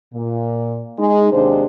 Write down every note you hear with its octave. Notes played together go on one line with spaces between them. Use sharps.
A#2
G#3 D#4
D#2 C3 G#3 D4 C5